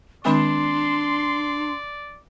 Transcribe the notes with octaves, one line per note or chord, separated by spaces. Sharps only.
D#3 G#3 C4 D4 D5 C6